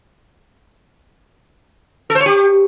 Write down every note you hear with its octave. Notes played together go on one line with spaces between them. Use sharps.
A4
C5
C#5
G4